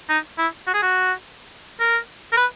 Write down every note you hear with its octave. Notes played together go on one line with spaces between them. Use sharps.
D#4
E4
F#4
G#4
F#4
A#4
A#4
B4